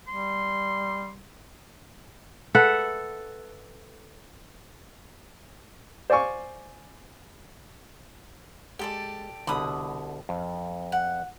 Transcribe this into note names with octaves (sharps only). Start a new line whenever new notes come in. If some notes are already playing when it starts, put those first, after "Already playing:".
G3 C6
A4 B4 E5 F#5
C5 D5 F5 G#5 C#6
G#3 G4 A4 D5
C2 B2 D3 B5 D#6
F2
F#5